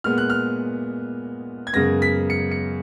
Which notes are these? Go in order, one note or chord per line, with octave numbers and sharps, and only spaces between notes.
A#2 G#3 B3 F6
F#6
F6
G#6
F#2 C#3 G#3 B3 A#6
B6
C#7
C#7